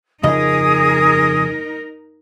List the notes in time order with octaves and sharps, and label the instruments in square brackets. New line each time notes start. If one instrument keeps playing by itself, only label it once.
[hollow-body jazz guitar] F2 C#3 D#5 [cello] D#4 A#4 [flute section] G#4 D#6